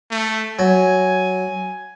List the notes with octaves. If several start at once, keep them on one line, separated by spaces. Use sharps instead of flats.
A3
F#3 G#5